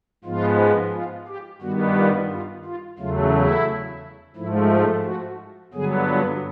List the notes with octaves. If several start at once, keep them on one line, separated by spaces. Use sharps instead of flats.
G#2 F3 G#3 B3 F4
F4
G4
G2 D#3 G3 B3 F#4
F4
F4
F4
E2 C#3 F#3 A3 F4
E4
G#2 F3 A3 E4
F4
F#4
G2 D3 F#3 B3 G#4
F4